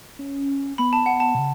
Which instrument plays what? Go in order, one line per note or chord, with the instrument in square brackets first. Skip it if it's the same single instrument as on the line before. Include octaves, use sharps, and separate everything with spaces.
[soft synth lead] C#4
[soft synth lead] B3 [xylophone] B5
[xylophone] A5
F#5
A5
[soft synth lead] B2
C#3